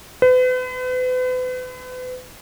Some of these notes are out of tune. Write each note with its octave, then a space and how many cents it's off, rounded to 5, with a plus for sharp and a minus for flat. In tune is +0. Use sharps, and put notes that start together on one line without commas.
B4 +40